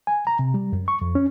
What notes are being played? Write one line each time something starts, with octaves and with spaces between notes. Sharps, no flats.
G#5
A#5
C3
G3
F#2
C#6
F2
C#4